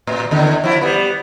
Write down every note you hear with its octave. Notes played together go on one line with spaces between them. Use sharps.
A2
D#2 D3
F3 E4
G3 B3